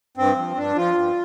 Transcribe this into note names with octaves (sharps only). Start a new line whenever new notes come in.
G2 C4
F3
G2 D4
F3 F4
G2